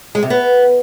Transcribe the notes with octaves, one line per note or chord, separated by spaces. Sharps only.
G#3
C3
B3